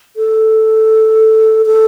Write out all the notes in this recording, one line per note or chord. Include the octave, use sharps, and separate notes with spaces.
A4
A4